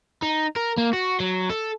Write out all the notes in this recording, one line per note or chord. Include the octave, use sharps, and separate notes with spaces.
D#4
A#4
A#3
F#4
F#3
A4